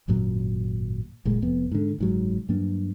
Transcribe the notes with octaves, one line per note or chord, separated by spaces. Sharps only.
G#1 F#2 A#2 F#3
F#1 A#2 G#3
F1 F2 B3
G#2 D3
F#1 G#2 F#3
G2 F#3 A#3 D4